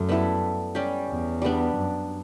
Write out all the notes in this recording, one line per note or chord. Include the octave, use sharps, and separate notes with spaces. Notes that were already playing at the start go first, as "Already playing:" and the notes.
Already playing: F#2 A3
G3 B3 E4 A4
G3 C#4 G4
E2
G3 B3 D4
F#2